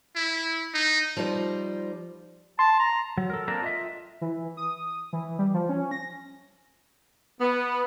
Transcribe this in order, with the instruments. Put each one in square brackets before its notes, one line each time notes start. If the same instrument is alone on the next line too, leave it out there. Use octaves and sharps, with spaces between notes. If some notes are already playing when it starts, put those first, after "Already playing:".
[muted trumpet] E4
D#4
[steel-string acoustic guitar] F3 G3 D#4 C5
[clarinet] A5 [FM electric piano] C6
[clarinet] A#5
[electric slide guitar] F#3
A4 A#4
A#3 C4 D4 A4 A#4 A#5
F4 D#5 E5
[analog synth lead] E3
D#6
E3
G3
F3
C#4
A#6
[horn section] B3